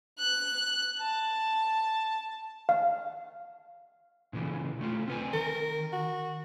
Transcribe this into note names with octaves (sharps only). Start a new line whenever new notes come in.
F#6
A5
F5
A#2 C#3 E3
C3 A3 F4
C4 B4 G#5
D#3 A#4
F#4